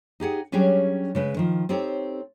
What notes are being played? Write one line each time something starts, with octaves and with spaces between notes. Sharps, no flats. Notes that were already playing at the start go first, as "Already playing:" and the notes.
D#4 G4 G#4 F#5
F#3 G3 C#4 D4 G4 G#4
C#3 G#3 B4
D#3 F3
C4 D#4 G4 A4 C#5